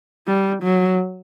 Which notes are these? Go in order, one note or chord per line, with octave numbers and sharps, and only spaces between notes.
G3
F#3